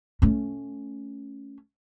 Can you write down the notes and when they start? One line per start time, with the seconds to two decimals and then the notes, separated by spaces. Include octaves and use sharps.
0.22 A3 C#4